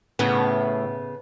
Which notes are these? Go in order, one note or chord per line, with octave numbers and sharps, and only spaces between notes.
A2 C#3 B3